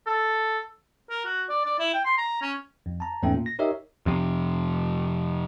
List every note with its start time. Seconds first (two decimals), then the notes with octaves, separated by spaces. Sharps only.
0.06 A4
1.10 A#4
1.26 F#4
1.49 D5
1.65 D5
1.79 E4
1.94 G5
2.05 C6
2.18 A#5
2.42 C#4
2.86 F2
3.00 A5 A#5
3.23 E2 G#2 A3 C#4 A4 G5
3.34 A#2
3.46 A#6
3.59 D#4 G4 A#4 C#5 D#5 E5
4.06 F2 C3